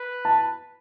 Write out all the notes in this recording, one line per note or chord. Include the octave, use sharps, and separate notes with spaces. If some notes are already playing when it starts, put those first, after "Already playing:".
Already playing: B4
A5